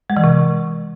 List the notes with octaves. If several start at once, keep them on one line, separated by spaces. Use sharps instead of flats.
G#3
E3
C3